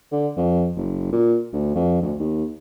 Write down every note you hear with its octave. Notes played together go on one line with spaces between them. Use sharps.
D3
F2
F#1
A#2
D2
F2
D2
D#2